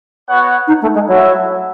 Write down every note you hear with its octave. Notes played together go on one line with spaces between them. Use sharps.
B3 F#4 C#5 F#5
D#4
A3
G#3
F#3 E4 A4 E5